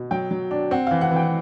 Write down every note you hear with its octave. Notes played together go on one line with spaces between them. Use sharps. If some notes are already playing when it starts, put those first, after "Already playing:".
Already playing: B2
F#3 G5
F#3
D4
C4 F#5
E3 F5
F#5
E3
G5